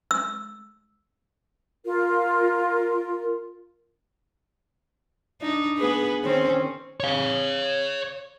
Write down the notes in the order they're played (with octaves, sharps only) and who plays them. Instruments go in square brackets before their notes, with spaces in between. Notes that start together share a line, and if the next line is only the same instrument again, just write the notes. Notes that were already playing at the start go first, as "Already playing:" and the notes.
[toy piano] E6
[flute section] F4 A#4
[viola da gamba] D4 D#4
B3 G#4 B4
D#3 C4 C#4
[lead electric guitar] C#5 F5